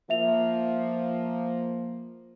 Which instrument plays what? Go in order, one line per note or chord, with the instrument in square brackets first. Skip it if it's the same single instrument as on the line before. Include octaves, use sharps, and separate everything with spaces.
[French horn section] F3 A#3 [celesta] E5 F7